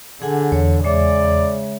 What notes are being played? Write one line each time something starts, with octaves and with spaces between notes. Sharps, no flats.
D3 G#4 F#5 G#5
E2 C#5
C#3 G#3 C#5 D5 E5